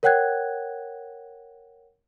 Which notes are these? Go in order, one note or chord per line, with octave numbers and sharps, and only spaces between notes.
A#4 C#5 F#5 G5 F#6 G#6